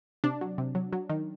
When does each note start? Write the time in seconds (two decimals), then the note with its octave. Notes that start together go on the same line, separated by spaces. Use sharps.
0.24 C3 D4
0.41 F#3
0.58 C3
0.75 F#3
0.93 F#3
1.09 D#3